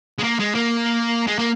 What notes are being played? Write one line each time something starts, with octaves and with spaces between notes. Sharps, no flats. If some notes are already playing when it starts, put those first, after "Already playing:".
G#3
A#3
G#3
A#3
G#3
A#3